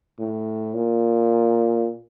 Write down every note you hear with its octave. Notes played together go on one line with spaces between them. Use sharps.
A2
A#2